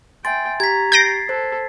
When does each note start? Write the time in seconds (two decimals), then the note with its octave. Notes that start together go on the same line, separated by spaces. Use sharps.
0.25 E5 G5 G#5 C6 A6
0.60 G4 A#5 G#6 B6
0.92 G6 A6 A#6 C7 D7
1.29 A4 C5